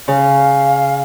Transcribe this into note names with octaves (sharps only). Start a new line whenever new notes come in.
C#3 F5